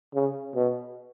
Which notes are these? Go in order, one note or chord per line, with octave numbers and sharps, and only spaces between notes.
C#3
B2